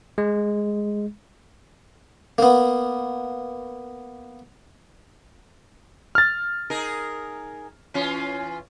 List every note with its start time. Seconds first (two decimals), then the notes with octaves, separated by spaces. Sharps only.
0.18 G#3
2.38 A#3 B3
6.15 F6 A6
6.70 D#4 G#4 A#4
7.94 E3 C#4 F4